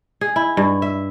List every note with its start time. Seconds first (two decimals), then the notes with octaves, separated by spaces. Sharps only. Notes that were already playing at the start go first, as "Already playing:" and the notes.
0.21 G#4
0.36 E4
0.57 G2
0.82 E5